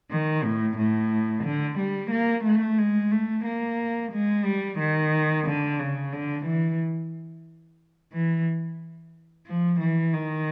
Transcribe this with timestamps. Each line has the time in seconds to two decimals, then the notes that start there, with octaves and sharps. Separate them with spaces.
0.11 D#3
0.44 A2
0.78 A2
1.44 D3
1.78 G3
2.11 A#3
2.45 A3
2.78 G#3
3.11 A3
3.45 A#3
4.12 G#3
4.45 G3
4.79 D#3
5.46 D3
5.79 C#3
6.13 D3
6.46 E3
8.13 E3
9.46 F3
9.80 E3
10.14 D#3